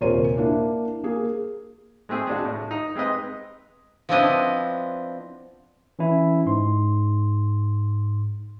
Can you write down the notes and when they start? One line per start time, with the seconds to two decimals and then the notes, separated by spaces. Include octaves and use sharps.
0.01 D#1 C3 A#4 C5 C#5 D#7
0.37 A#3 D4 E4
1.03 A#3 G#4
2.09 G#3 A3 C4 G#4
2.27 G#3 D4 F#4
2.45 A2
2.71 D#4
2.95 G#3 C4 B4 D#5
4.09 F3 B3 C4 D4 E4 D#5
5.99 E3 C#4 E4
6.46 G#2 C6